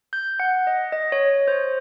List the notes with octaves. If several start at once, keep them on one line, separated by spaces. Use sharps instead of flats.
G6
F#5
D#5
D#5
C#5
C5